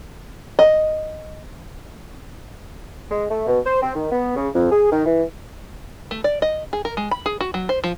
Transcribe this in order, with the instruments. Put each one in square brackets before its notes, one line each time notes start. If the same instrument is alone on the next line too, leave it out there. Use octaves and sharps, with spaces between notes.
[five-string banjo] D#5
[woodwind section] G#3
A3
B2
C5
C4
D#3
B3
C#3
F2
G#4
D#3
E3
[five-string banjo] A3
D5
D#5
G#4
A#4
G#3
B5
G#4
F#4
F#3
C5
F3